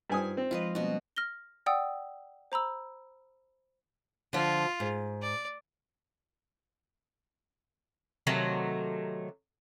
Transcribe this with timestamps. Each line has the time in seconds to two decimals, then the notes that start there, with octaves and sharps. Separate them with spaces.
0.10 G2 D#4 F4 C5 G#5 D#6
0.37 C4
0.51 F3 G#3 F4 B4 D#5
0.75 B2 G3 A#3 C#4 F#4
1.16 F6 A#6 G7
1.66 D5 F#5 G5 D#6 E6
2.52 C5 A#5 B5 E6
4.33 D3 F3 F4
4.80 G#2
5.22 D5
8.27 C3 D#3 F#3 A3